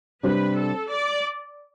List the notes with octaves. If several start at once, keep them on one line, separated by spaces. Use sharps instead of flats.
C3 G3 D4 G4 B4 C5
A4
D5